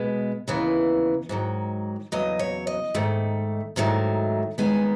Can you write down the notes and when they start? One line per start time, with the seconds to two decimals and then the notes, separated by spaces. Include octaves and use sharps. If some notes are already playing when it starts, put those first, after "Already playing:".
Already playing: B2 G#3 B3
0.48 D#2 C#3 E3 B3
1.29 G#2 D#3 F#3
2.12 E2 C#3 F#3 D#5
2.39 C#5
2.67 D#5
2.94 G#2 D#3 A3
3.76 G#2 D#3 F#3 A3
4.58 D#2 D#3 G#3 B3 G#5